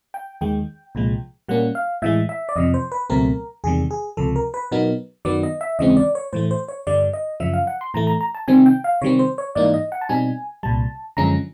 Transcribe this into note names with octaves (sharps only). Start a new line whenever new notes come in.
G5
D#2 D#3 G#3 G5
C2 A#2 F3 G#3
A#2 G3 A#3 C#4 F#5
F5
A2 E3 G#3 E5
E5
D5
F2 C3 F3 D#5
C5
B4
C#2 B2 F#3 A3 C4 A#4
E2 C3 D#3 G3 G#4
G#4
C#2 C3 F3 A4
A#4
B4
B2 F#3 B3 D#4 A#4
F#2 D#3 F#3 B3 D5
D#5
E5
D#2 C#3 E3 G#3 C4 D#5
D5
C#5
A2 E3 A3 C5
C5
C#5
G2 D3 G3 D5
D#5
F#2 C#3 F3 E5
F5
F#5
C6
A2 E3 A3 A#5
A#5
A#5
A5
C3 D#3 G3 C4 G#5
G5
F5
C3 D#3 G3 C4 C#5
C5
C#5
G#2 E3 G3 A#3 D#4 D5
D#5
F#5
A5
B2 G3 C4 D#4 G#5
C2 A#2 G3 A5
F#2 D3 F3 G#3 C#4 A#5